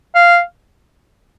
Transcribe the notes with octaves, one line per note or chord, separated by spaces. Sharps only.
F5